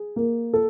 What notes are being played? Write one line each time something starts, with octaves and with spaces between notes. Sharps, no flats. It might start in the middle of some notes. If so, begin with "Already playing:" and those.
Already playing: G#4
A#3
A4